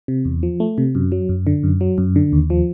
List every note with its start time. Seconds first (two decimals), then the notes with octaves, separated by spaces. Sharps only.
0.08 C3
0.25 E2
0.43 F3
0.60 A3
0.78 C3
0.95 F#2
1.12 F#3
1.29 F#2
1.47 D3
1.63 F#2
1.81 F#3
1.98 F#2
2.16 D3
2.32 D#2
2.50 F3